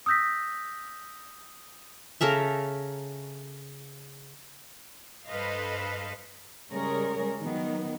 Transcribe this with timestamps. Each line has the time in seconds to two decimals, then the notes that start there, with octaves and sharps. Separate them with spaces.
0.06 D#6 E6 G6 A#6 B6
2.21 C#3 A4 A#4 E5
5.27 G2 A4 B4 C5 D#5 F5
6.71 C#3 G3 G#3 G#4 A#4 C#5
7.41 D#3 F#3 B3